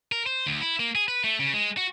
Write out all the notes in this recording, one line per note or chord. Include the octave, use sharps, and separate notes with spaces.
A#4
C5
D2
E4
A#3
G#4
B4
A3
C#3
G#3
F#4